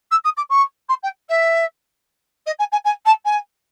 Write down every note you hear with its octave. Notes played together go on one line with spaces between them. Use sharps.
E6
D#6
D6
C#6
C6
G5
E5
D#5
G#5
G#5
G#5
A5
G#5